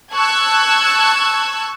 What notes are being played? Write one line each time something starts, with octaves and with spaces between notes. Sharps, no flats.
A5 C#6 E6 F#6 G#6